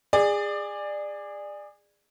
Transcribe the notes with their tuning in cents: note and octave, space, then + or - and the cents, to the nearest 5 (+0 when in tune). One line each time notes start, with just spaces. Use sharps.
G#4 -20 D5 +20